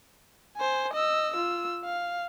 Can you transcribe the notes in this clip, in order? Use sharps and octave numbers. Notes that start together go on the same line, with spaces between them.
C5 G#5
D#5 E6
F4 E6
F5